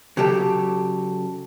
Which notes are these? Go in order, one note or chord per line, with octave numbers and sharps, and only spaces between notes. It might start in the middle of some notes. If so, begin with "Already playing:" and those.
C#3 F#3 G4 A4